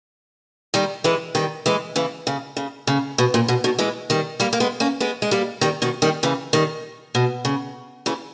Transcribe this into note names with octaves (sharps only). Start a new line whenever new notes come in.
D#3 G3
E3 G#3
D#3 G3
E3 G#3
C#3 E3
C#3
C#3
C#3
B2
A#2
B2
B2 D#3
E3 G#3
D#3 G3
G3 A#3
A#3
G#3 B3
A#3 C#4
G#3 B3
G#3
G3 A#3
D#3 G3
B2 D#3
D#3 G3
C#3 E3
D#3 G3
B2
C#3
C#3 E3